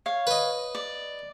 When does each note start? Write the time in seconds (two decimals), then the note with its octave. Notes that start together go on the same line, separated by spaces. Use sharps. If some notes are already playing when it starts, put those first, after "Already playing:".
0.06 C#5 F5
0.27 B4 D#5
0.75 D5